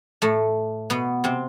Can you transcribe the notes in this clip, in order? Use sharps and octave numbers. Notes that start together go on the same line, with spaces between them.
A2 A3
B2 B3
C3 C4